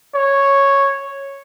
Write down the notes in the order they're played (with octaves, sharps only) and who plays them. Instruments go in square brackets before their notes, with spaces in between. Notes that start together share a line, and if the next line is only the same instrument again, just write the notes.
[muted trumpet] C#5